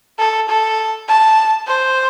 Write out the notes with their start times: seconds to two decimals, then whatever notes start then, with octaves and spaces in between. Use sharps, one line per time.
0.19 A4
0.49 A4
1.08 A5
1.67 C5